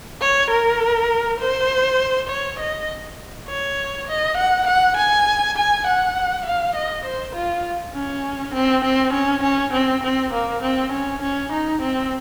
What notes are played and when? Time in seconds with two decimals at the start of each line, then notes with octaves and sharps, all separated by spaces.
0.21 C#5
0.51 A#4
1.40 C5
2.29 C#5
2.59 D#5
3.48 C#5
4.08 D#5
4.37 F#5
4.67 F#5
4.97 G#5
5.57 G#5
5.87 F#5
6.45 F5
6.75 D#5
7.05 C5
7.35 F4
7.94 C#4
8.54 C4
8.84 C4
9.13 C#4
9.43 C#4
9.73 C4
10.03 C4
10.33 A#3
10.62 C4
10.92 C#4
11.22 C#4
11.52 D#4
11.82 C4